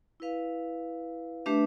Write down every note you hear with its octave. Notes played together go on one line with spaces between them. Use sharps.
E4 B4 F5
A3 D4 G4 B4 E5